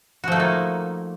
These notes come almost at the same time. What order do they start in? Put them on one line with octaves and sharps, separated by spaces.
F#4 F3 A3 D#4 A#3